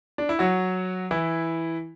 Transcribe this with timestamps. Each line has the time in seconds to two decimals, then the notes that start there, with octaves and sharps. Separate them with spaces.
0.18 D4
0.29 E4
0.39 F#3 F#4
1.11 E3 E4